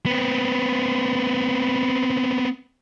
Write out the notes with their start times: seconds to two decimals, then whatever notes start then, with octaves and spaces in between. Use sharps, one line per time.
0.06 B3 C4